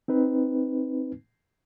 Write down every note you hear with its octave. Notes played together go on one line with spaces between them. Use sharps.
C4 D#4 B4